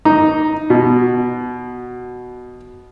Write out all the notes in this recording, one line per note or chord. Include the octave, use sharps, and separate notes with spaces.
D#4
B2